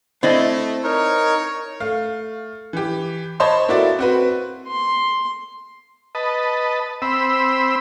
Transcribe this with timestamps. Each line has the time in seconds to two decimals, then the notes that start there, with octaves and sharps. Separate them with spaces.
0.23 A3 C4 E4 D5 D#5
0.84 D#4 A#4 C#5
1.80 A3 F5
2.73 E3 G4
3.40 C5 C#5 D#5 A5 B5 C6
3.68 A#3 E4 F#4 A4 D5 E5
3.99 C4 F#4 B4
4.68 C6
6.15 B4 D#5 A5
7.02 C4 B5 E6